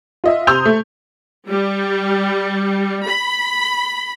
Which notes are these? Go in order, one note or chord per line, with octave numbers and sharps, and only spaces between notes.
F4 D#5 E5
C3 C6 D#6 E6 G6 F7
A3
G3
B5